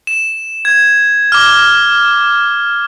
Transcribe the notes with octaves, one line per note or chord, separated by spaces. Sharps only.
E7
G#6
D6 F6